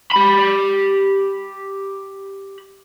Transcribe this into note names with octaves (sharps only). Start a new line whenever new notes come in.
G4 B5